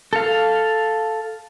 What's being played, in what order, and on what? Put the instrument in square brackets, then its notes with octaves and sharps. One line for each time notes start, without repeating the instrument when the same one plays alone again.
[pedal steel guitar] A4 F5